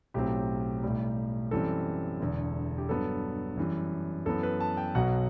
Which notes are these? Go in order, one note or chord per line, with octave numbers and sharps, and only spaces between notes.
B1 A2 F#3 C4 G4
B1 A2 G3
F#2 E3 G3 C4 A4
E1 E2 D3
G4
G2 F#3 B3 A4
F#2 E3 G3
F#2 E3 B3 A4
B4
A5
G5
B1 B2 F#3 F#5